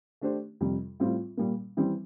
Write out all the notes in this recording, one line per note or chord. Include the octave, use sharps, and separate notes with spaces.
A3 D4 G4 C5
F2 C3 G3
A2 G3 C4 F4
A#2 G3 A#3
E3 G3 C4